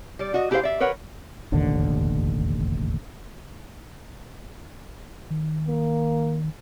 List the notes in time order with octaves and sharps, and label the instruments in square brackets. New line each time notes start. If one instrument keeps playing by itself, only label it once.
[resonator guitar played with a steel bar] G3 D5
F#4 D#5
E4 G4 G#4 B4 C5 F5
D5 E5
A#4 B4 C#5 F#5
[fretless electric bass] E1 A1 D#2 D3
[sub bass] D#3
[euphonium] A#3